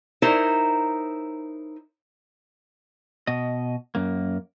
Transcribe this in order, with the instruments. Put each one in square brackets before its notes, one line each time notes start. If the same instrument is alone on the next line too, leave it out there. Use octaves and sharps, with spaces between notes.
[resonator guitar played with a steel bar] D#4 E4 A#4 C5 C#5
[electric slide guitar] B2 D#5
F#2 A#3